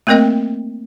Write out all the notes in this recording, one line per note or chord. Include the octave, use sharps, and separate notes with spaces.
A3 A#3 C4 A#4 D#5 G5